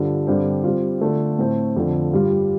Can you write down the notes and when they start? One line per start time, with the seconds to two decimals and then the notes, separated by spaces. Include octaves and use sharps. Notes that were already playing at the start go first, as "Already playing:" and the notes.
Already playing: G2 D3 F3
0.27 G2 D3 G3 C4
0.64 G2 G3 C4 F4
1.01 D3 A3 F4
1.39 A2 A3 C4
1.76 F2 D3 F3
2.13 G2 G3 F4